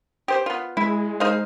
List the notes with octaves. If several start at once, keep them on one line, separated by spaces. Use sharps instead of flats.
G4 C5
B3 F4
G#3 E4
D#4 C5 F5